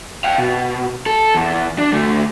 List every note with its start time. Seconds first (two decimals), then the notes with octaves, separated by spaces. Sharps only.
0.24 F5 G5
0.38 B2
1.06 A4
1.34 E2
1.78 D4
1.93 D2 A3